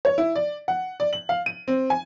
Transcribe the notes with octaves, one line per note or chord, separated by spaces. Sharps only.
C#5
E4
D5
F#5
D5
F#7
F5
D#7
C4
G#5